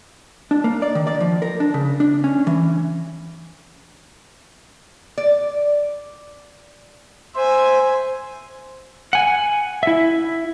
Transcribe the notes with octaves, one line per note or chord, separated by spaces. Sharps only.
D4
A#3
D5
D#3
D5
F3
A#4
D4
C#3
D4
C#4
E3
D5
C5 E5 G#5
F#5 G#5
E4 E5